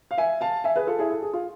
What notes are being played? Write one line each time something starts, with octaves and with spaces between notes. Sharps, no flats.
F5
E5 G#5
F5 A5
E5 G#5
G#4 B4
F4 A4
E4 G#4
A4
G#4
F4